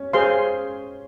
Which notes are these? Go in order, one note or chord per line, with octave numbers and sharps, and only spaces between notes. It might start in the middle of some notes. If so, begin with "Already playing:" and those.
Already playing: C#4
G#4 C5 F5 C6